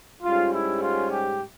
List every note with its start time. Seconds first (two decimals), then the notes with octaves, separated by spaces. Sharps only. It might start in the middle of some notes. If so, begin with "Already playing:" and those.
0.22 G#2 G3 C#4 F4
0.52 E4
0.81 F4
1.11 G4